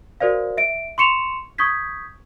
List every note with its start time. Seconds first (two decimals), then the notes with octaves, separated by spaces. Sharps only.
0.20 F#4 A#4 C5 D5 F5
0.57 E5 D7
0.98 C6 C#6 C#7 E7 F7
1.58 C#6 D#6 G6 G#6 B6